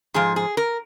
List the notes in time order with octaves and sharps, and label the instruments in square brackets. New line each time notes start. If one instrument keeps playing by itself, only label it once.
[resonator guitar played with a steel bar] G#2 F3 G#4
G#4
A#4